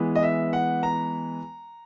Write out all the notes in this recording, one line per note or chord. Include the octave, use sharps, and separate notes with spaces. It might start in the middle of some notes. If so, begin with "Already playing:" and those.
Already playing: E3 G#3 B3
D#5
E5
F#5
A#5